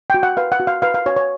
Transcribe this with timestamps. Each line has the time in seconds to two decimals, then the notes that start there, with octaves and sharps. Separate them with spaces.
0.10 F#4 G5
0.23 F#5
0.37 B4 F5
0.52 F#5
0.60 F#4
0.67 F5
0.82 B4 F5
0.94 F5
1.06 F#4 C#5
1.17 C#5